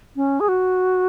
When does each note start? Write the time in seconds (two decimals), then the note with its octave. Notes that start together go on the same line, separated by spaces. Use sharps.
0.16 C#4
0.40 G#4
0.49 F#4